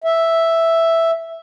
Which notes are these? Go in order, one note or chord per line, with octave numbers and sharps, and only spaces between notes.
E5